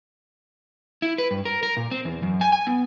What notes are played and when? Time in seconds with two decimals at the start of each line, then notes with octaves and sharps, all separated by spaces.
1.02 E4
1.18 B4
1.31 G2
1.45 A#4
1.63 A#4
1.77 A#2
1.91 C4
2.05 E2
2.23 F#2
2.41 G#5
2.52 G#5
2.67 B3